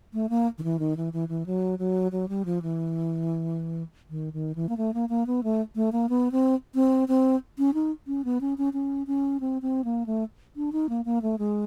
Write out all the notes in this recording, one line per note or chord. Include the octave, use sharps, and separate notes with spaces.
A3
A#3
D#3
E3
D#3
E3
E3
E3
F#3
F#3
F#3
G3
F3
E3
D#3
D#3
E3
A#3
A3
A#3
A#3
B3
A3
A3
A#3
B3
C4
C4
C4
C#4
D#4
C#4
B3
C#4
C#4
C#4
C#4
C4
C4
A#3
A3
D4
D#4
A#3
A#3
A3
G#3